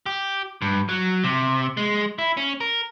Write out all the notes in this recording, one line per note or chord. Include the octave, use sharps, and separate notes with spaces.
G4
G2
F#3
C3
G#3
E4
C#4
A#4